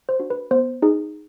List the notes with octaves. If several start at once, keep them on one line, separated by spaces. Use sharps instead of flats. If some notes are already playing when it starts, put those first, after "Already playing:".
C5
D4 F#4
B4
B3 C5
D#4 G#4